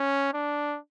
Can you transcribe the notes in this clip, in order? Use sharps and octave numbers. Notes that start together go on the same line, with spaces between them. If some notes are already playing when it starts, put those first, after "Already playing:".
Already playing: C#4
D4